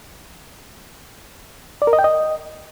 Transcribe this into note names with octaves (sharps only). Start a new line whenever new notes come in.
D5
A#4
D#5
G5
D#5